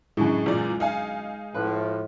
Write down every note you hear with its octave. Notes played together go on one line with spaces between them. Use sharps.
F#2 A2 D3 G#3 E4
E2 A#2 D5
D#4 F5 G#5
A2 F3 B4